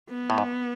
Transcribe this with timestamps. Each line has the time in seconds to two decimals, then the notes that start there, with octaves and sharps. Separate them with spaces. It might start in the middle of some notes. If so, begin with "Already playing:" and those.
0.10 B3
0.30 A2
0.38 G#2